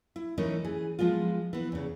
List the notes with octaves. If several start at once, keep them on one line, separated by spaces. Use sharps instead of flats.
E4
E3 A3 C#4 D#4 A#4 D#5
E3 G#4
F3 G#3 B3 F4
E3 B3
E2 C#3